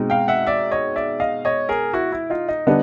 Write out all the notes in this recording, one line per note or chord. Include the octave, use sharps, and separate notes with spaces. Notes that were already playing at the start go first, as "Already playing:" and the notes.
Already playing: B2 G#3 C4 D#4
F5 G5
E5 F#5
D5 E5
C#5 D#5
D5 E5
D#5 F5
C#5 D#5
G#4 A#4
E4 F#4
E4
D#4 F4
D#4
D3 G3 B3 D4 D#4